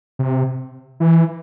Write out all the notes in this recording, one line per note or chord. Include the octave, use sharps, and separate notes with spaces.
C3
E3